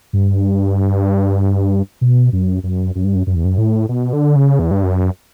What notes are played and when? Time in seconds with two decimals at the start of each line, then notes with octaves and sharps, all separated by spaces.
0.13 G2
2.01 B2
2.33 F#2
2.63 F#2
2.95 F#2
3.04 G2
3.15 F#2
3.27 F#2
3.35 E2
3.44 F#2
3.58 A2
3.89 B2
4.13 D3
4.36 C#3
4.59 E2
4.71 G2
4.83 F#2